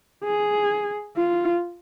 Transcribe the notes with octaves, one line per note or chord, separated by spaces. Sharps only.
G#4
F4